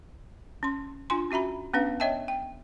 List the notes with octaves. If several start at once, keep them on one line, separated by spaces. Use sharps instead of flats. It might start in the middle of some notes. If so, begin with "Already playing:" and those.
C#4 C6
D4 F4 G#5 C6
C#4 F#4 E5 A#5 B5
B3 C#4 D4 B4 F5
C#5 D#5 E5 G5 A5
G5